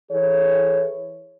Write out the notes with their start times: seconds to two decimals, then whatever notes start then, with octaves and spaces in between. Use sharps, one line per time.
0.12 E3 G#4 A4 C#5